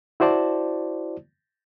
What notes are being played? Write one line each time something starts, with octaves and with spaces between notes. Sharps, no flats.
E4 F#4 C5 D5 A5